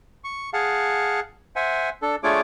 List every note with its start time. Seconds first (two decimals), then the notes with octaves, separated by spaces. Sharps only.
0.24 C#6
0.53 G#4 F5 F#5 A5
1.56 C5 E5 F#5 G#5
2.02 D4 A4
2.24 A3 D4 F4 G#4 C#5 D6